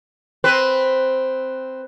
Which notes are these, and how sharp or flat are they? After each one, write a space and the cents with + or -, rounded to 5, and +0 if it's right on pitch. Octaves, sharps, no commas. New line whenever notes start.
C4 +0 B4 +5